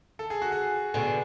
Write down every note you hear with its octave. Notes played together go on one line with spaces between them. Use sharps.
A4
G#4
F#4
G#4
B2 D3 G#4